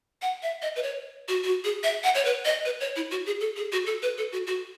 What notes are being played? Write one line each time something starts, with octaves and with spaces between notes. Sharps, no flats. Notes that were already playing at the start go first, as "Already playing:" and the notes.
F#5
E5
D#5
B4
C#5
F#4
F#4
G#4
E5
F#5
C#5
B4
D#5
B4
C#5
E4
F#4
G#4
A4
G#4
F#4
A4
B4
A4
F#4
F#4